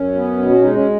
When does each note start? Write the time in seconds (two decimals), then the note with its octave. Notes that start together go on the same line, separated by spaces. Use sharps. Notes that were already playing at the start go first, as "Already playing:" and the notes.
Already playing: F#2 C#4
0.15 B3
0.38 B2
0.50 F#4
0.62 G#3 D#4
0.74 C#4